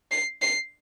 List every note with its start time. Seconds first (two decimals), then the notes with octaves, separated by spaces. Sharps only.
0.11 C7
0.42 C7